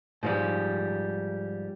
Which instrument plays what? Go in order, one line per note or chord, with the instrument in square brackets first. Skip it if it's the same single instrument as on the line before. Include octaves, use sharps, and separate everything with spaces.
[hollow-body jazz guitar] G#2 F3 G3